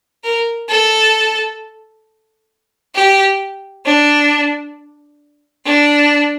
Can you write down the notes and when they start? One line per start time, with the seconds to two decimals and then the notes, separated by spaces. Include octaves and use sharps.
0.24 A#4
0.69 A4
2.94 G4
3.86 D4
5.65 D4